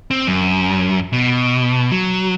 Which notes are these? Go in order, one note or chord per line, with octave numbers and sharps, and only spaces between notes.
C4
F#2
B2
F#3